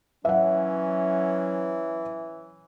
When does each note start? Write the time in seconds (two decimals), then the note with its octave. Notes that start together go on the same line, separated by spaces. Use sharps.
0.25 E3 F#3 C#4 E5 F#5